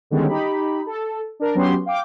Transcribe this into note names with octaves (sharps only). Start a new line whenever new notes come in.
D3 D#3 G3 G#3 B3 C#4
D#4 G4 B5
A4
D4 A#4
F#3 B3 C#4 F#4 G4 C6
F5 G5 D6